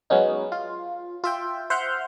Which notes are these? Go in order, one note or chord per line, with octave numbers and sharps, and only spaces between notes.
F#3 G#3 B3 C#4 D#4
F4
F4 E5 G5
C5 E5 F#5 C6 F6 G6